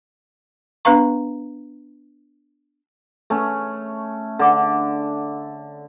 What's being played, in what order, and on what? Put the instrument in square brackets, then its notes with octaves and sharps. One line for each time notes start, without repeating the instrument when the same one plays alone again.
[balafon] B3 D4 B4 F5 A#5 C#6
[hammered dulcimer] A3 C#4
D3 D6